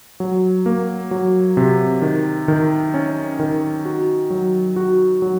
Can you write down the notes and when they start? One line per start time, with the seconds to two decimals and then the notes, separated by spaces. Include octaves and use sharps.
0.20 F#3
0.66 A#3
1.11 F#3
1.57 C3
2.02 D#3
2.48 D#3
2.94 C#4
3.40 D#3
3.85 F#4
4.30 F#3
4.76 F#4
5.22 F#3